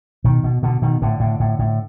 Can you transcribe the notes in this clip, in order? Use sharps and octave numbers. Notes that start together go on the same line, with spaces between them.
B2 D#3
B2
B2 D3
B2 D#3
A2 D3
A2
A2
A2